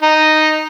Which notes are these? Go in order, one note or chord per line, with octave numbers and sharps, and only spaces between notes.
D#4